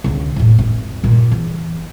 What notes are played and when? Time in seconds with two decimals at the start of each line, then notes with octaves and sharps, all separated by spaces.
0.04 C#2 D3
0.36 E1 A2
0.58 G#1
1.03 G2 A#2
1.31 E2